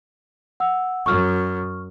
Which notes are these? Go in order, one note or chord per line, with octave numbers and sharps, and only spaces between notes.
F#5 E6
F#2 C#6 F6